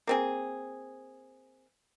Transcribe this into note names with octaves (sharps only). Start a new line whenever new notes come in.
A#3 C4 G#4